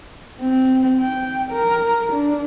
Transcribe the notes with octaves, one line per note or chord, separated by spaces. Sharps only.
C4
G5
A#4
D4